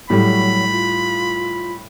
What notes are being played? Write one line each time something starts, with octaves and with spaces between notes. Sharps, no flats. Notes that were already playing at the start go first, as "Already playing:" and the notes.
A2 F#3 G3 B5
F4